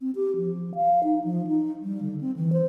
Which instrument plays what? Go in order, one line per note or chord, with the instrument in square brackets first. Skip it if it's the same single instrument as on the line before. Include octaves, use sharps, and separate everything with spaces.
[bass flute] C4
G4
F3
F5
D#4
F3
D#4
G3
D3
C4
E3
C5